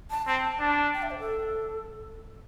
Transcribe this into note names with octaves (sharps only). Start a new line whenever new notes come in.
A5
C4 A5
D4
G5
E5
C5
A4